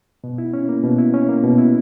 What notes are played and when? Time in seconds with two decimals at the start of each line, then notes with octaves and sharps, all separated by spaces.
0.24 B2
0.38 E4
0.53 C#4
0.69 A#3
0.84 B2
0.98 E4
1.14 C#4
1.29 A#3
1.44 B2
1.58 E4